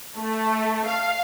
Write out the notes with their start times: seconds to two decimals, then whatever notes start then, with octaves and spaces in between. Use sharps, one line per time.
0.17 A3
0.87 F5